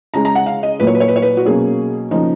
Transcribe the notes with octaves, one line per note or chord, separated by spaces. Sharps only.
C#3 G#3 C#4 A#5
A#5
F#5
F5
D#5
A#2 F#3 A#3 B4
C#5
B4
C#5
B4
C#5
B4
F#4
B2 F#3 A#3 C#4 G#4
C#3 F3 A#3 D#4